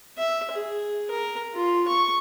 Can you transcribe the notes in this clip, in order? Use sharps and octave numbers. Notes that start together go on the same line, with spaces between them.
E5
G#4
A#4
F4
C#6